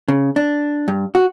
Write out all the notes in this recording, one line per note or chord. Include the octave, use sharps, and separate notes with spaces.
C#3
D4
G2
F#4